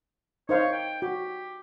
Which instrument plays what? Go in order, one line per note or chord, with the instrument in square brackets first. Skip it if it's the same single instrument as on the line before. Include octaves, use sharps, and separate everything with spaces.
[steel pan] D#4 C5 F5 [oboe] C#5
[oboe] G5
[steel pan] F#4 [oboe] G4